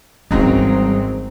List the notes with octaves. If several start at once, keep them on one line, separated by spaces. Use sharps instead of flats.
G#1 C#3 E3 F#3 G3 C4 D#4